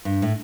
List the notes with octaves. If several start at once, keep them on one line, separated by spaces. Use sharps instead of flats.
G2
A2